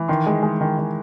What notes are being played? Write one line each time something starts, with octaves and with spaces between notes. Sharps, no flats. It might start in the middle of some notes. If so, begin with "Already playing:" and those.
Already playing: E3
D#3 C6
G#3
G#3
D#3
D#3